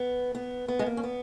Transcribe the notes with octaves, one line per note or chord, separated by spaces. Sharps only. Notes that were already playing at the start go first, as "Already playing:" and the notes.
Already playing: B3
B3
B3
G#3
A#3
C#4
B3